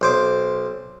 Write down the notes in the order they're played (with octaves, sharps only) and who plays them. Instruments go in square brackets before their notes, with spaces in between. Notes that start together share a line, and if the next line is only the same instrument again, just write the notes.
[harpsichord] B1 C5 D6